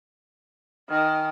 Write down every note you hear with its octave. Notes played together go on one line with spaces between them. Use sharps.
D#3 G#5 D#6 F6